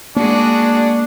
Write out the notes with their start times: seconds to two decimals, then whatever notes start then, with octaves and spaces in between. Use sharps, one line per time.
0.16 G#3 A#3 D4 F#4 G#4